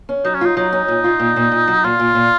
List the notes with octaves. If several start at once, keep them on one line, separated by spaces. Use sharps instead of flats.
C#4
F#3 D#4
C#4
D#4 F4
F#3 D#4
C#4
A#2
F4
A#2
A#2
A#2
F#3
A#2 F4
A#2
A#2